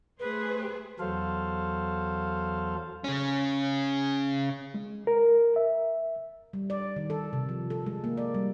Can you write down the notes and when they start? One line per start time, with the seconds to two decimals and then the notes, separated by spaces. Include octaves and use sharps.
0.19 A3 G#4 B4 C5
1.00 E2 F#3 A4 C5 F5
3.04 C#3 C#4
4.74 G#3
5.07 A#4
5.56 E5
6.53 G3
6.70 D5
6.96 D#3
7.10 A4
7.33 C3
7.49 F3
7.70 A4
7.86 G#3
8.04 A#3
8.17 D5
8.34 G3